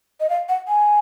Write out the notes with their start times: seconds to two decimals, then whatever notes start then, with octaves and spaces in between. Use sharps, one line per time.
0.20 D#5
0.30 F5
0.49 F#5
0.68 G#5